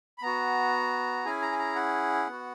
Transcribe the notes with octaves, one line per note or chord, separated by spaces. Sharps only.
B5
B3 F#4 A#5
C#4 E4 G#4 G#5
A#5
G#5
A#5
F#5
B3 F#4